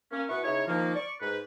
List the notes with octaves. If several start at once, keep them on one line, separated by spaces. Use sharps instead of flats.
A#3 C#4
B2 B3 E4 B4 F#5 C#6
C#3 D#4 E4 C#5
D#3 F3 A#3
D5 C#6
G#2 B4